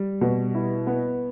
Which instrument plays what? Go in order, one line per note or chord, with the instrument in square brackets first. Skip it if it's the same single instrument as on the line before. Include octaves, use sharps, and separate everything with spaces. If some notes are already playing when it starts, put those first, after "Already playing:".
Already playing: [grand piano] G3
B2
E4
B3